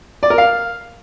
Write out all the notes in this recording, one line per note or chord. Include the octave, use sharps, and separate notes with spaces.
D5
A#4
F5